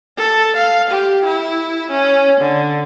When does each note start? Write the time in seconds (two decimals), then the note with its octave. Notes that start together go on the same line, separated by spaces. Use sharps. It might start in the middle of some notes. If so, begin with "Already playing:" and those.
0.17 A4
0.56 F5
0.90 G4
1.25 E4
1.91 C#4
2.41 D3